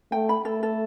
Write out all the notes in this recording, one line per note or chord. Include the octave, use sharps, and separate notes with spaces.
A3 G5
B5
A3 A4
A4